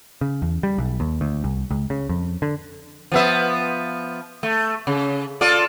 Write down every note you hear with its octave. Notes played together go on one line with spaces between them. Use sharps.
C#3
E2
G3
B1
D#2
D2
C2
C#2
C#3
F2
D3
F3 B3 E5
A3
C#3
F4 A4 D5